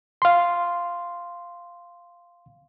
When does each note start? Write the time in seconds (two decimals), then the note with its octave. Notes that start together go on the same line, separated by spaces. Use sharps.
0.22 F5 C6